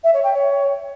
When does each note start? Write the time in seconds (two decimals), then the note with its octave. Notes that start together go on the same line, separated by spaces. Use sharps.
0.04 E5
0.14 C#5
0.24 G5
0.34 C#5